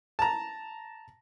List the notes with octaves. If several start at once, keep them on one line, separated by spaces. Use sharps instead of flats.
A5 A#5